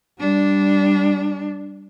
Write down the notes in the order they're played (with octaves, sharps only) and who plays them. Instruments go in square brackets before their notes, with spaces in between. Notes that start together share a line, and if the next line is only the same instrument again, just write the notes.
[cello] G3 D4